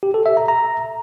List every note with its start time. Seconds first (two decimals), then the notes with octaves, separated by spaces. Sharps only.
0.03 G4
0.14 A4
0.26 E5
0.37 A#5
0.48 A#5